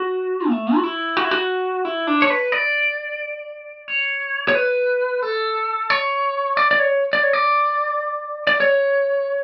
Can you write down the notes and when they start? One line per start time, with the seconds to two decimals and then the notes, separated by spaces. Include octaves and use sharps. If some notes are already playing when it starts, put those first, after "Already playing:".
Already playing: F#4
0.49 A3
0.76 F#4
0.83 E4
1.17 F#4
1.24 E4
1.31 F#4
1.85 E4
2.07 D4
2.22 C#5
2.30 B4
2.52 D5
3.88 C#5
4.48 C#5
4.55 B4
5.22 A4
5.90 C#5
6.57 D5
6.71 D5
6.79 C#5
7.13 D5
7.23 C#5
7.33 D5
8.47 D5
8.60 C#5